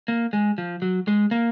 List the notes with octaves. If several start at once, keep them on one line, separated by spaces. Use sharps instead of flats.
A#3
G#3
F3
F#3
G#3
A#3